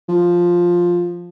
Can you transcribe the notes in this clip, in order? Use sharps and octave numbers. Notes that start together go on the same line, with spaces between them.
F3